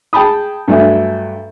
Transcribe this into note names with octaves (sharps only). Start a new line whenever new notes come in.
G#4 G5 A5 B5 D#6
G2 F#3 A3 D4 E5 G#5